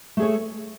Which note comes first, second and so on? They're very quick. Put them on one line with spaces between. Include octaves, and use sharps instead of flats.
A3 G#4 C#5 A4